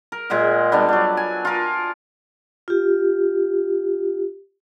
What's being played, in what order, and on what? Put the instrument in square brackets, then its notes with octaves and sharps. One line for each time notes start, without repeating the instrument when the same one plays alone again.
[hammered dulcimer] A#4
A#2 G#3 E5 F#5
G3 B3 D4
F#3 D4
G#5
F4 A#4
[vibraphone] F4 G4